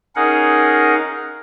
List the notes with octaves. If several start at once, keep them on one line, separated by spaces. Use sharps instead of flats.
C#4 D#4 G#4 A#4 F5 F#5